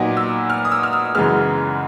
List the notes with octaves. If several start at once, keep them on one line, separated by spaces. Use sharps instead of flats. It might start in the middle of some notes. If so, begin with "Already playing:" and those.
Already playing: A#2 F#3 B3 D#4 D6
E6
F6
D#6
E6
F6
E6
F#2 C#3 E3 G#3 B3 F6